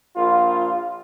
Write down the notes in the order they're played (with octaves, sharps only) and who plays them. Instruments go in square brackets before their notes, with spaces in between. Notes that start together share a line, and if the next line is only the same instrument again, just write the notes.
[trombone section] A#1 F4